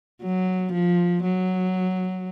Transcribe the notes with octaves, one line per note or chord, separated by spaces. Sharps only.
F#3
F3
F#3